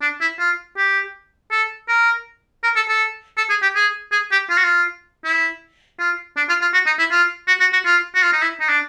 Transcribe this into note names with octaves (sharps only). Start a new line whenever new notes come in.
D4
E4
F4
G4
A4
A#4
A#4
A4
A4
A4
G#4
G4
G#4
G#4
G4
F4
F#4
F4
E4
F4
D4
F4
F4
F#4
D#4
E4
F4
F#4
F#4
F#4
F4
F#4
F4
D#4
E4
D#4
D4